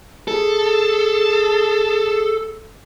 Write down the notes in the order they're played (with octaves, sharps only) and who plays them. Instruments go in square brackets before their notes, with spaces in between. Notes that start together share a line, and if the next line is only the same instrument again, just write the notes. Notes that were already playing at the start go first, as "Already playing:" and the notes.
[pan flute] G#4 [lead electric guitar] A4